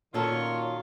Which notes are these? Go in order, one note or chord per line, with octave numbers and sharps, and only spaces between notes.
A#2 D#3 C#4 F4 F#4 A4 C#5